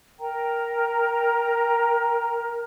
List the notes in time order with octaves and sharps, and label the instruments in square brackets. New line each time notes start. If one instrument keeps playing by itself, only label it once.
[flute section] A#4 G5 A#5